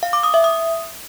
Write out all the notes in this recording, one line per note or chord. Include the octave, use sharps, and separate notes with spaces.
F5
D6
D#6
E5
D#6